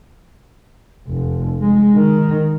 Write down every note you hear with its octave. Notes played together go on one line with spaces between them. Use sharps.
F1
G#3
D#3